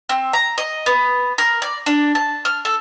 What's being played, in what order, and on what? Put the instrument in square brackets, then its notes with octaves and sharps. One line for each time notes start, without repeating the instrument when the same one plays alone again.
[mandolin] C4
A#5
D#5
B3
A#4
D5
D4
A5
F6
A4